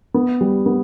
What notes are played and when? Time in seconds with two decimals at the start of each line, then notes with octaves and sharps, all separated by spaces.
0.14 B3
0.41 G3
0.66 B3